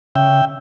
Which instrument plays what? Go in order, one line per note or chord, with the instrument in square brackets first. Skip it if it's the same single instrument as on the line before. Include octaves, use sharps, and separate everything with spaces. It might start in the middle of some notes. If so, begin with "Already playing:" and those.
[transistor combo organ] C#3 E5 G5